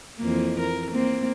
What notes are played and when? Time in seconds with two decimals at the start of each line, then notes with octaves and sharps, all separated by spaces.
0.19 F2 E3 A#3
0.60 A#4
0.92 A#3 C4